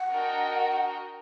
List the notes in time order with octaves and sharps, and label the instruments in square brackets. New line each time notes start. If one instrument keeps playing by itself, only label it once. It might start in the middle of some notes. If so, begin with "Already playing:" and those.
Already playing: [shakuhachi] F#5
[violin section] D4 F#4 A#4 D#5 G5